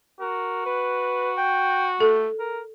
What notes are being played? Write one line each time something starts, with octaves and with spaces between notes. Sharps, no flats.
F#4 A#4
B4
G5
A3 A4
A#4